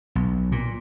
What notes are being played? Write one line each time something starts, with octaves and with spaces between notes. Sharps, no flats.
B1
A#2